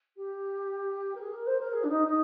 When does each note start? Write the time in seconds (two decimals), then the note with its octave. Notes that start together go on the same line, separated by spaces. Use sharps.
0.16 G4
1.15 A#4
1.19 G#4
1.33 A#4
1.46 C5
1.59 A#4
1.72 G#4
1.83 D4
1.89 D#4
2.06 D#4